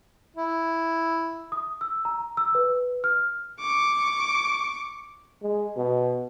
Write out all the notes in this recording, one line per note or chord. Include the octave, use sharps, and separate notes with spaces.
E4
D#6
E6
A#5
E6
B4
F6
C#6 D6
G#3
B2